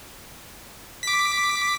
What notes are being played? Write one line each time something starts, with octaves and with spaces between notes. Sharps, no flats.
D6 B6